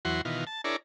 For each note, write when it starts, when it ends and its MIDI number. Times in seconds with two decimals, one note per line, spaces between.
0.05 0.21 40
0.05 0.21 52
0.05 0.21 54
0.05 0.21 66
0.05 0.21 84
0.25 0.45 47
0.25 0.45 51
0.25 0.45 52
0.25 0.45 65
0.47 0.61 81
0.64 0.76 62
0.64 0.76 64
0.64 0.76 68
0.64 0.76 70
0.64 0.76 73
0.64 0.76 74